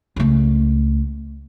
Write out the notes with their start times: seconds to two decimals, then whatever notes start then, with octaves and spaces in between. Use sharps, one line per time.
0.16 C#2 A3